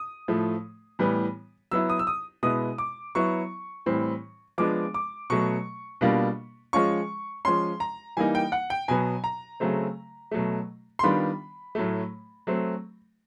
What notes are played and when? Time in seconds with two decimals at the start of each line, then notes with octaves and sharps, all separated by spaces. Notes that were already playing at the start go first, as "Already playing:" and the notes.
Already playing: D#6
0.28 A2 F3 A3
0.99 A2 E3 G3 B3
1.71 F#3 B3 E4 E6
1.89 D#6
1.99 E6
2.07 D#6
2.43 B2 G#3 B3 E4 D#6
2.78 D6
3.15 F#3 B3 E4 C#6
3.86 A2 E3 G3 C4
4.58 F3 G#3 B3 D4 D6
4.94 D6
5.30 B2 F#3 A3 C#6
6.01 B2 G3 A#3 D4 F4
6.73 F3 G#3 C#4 F4 C#6
7.45 F3 G#3 C#4 C6
7.80 A#5
8.17 E3 G3 A#3 D#4 G#5
8.35 G5
8.52 F#5
8.70 G5
8.88 B2 F#3 B3 G#5
9.24 A#5
9.60 C#3 F#3 A3 C4
10.31 B2 F#3 A3
10.99 C6
11.03 D#3 G3 B3 D4 F4 B5
11.75 A2 F#3 A3
12.47 F#3 A3 C4